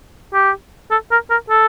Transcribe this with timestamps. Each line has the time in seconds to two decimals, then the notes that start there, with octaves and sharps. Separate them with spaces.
0.33 G4
0.91 A4
1.11 A#4
1.30 A#4
1.50 A4